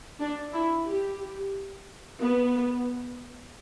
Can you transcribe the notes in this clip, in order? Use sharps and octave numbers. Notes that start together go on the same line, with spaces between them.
D4
E4
G4
B3